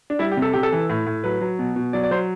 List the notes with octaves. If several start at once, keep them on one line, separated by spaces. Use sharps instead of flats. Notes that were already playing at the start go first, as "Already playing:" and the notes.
D4
G3 E4
G4
C3
A4
C3 G4
A4
E3
A2
A2
F#3 B4
F#3
B2
B2
F#3 D5
D5
F#3 C5